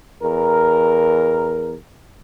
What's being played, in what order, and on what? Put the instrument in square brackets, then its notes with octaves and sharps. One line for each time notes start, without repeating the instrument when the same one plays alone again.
[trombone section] E2 A#4